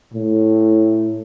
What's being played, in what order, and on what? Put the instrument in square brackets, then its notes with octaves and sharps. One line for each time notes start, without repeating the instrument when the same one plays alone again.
[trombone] A2